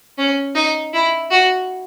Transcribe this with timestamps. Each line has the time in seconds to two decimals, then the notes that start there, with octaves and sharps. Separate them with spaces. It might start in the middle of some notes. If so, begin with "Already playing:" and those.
0.18 C#4
0.55 D#4
0.93 E4
1.31 F#4